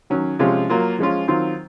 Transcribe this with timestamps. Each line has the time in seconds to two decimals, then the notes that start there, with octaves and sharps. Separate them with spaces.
0.10 D#3 F#3 C#4
0.39 C3 F3 G#3 C#4 F4
0.69 F#3 A#3 F4
0.99 F3 G#3 C#4 F4
1.28 D#3 F#3 C4 F4